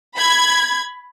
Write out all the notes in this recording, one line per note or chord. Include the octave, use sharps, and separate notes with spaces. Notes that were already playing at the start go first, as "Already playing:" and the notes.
B5 G#6